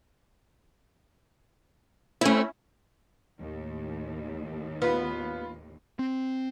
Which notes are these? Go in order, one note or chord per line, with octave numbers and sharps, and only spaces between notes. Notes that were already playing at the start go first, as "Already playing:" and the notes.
A3 C4 C#4 E4
D#2 A2
B3 F4 B4
C4